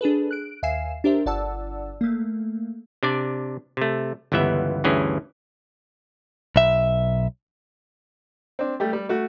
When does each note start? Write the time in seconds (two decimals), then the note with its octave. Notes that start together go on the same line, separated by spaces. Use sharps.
0.01 D4 G#4 A4 B4
0.31 F#6 D7
0.63 D#2 E5 F5 G#5 C7 E7
1.04 D4 G4 A#4 C5 E5
1.26 G1 D5 F#5 A5 E6
2.01 A3 A#3
3.03 C3 D4 D5
3.77 C3 A3
4.32 G1 C#2 E3 B3 E5
4.84 D2 G2 E3 C#4 G#4
6.56 B1 E5
8.59 C4 D4
8.80 G3 A3 G4
8.93 G3
9.09 A3 F#4